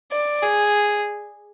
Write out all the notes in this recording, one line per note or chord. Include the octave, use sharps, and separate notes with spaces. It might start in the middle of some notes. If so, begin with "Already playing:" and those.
D5
G#4